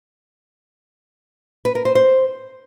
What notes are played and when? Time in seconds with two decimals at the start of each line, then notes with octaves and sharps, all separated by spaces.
1.65 B4
1.75 A#4
1.85 C5
1.95 C5